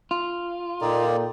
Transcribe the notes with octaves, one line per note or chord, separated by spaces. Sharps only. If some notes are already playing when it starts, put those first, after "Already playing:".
F4
A#2 A#3 D#4 A4 D5 G5